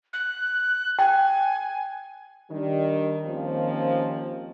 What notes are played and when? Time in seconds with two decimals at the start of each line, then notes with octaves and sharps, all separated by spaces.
0.13 F#6
0.99 G5 G#5
2.50 D#3 G3 D4
3.25 D#2 D#3 F3 A#3 C4 C#4